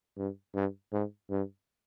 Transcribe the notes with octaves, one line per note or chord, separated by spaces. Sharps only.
G2
G2
G#2
G2